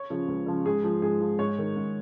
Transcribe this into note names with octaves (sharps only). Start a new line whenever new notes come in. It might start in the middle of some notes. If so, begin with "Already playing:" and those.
Already playing: C#5
C#3 F3
C#2
C#3 F3
G#2 G#4
F3
G#2 G#4
F3
G#2 C#5
D#3
G#2